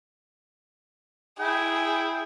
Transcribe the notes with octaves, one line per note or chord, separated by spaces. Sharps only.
E4 G#4 G5